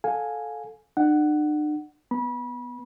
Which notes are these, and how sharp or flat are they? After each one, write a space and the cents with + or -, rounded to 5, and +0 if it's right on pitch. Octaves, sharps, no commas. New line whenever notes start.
A4 -10 F5 +25 G#5 +0
D4 +45 F#5 +10
B3 +0 B5 -30